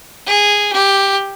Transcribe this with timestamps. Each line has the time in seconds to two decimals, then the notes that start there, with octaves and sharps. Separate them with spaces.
0.27 G#4
0.73 G4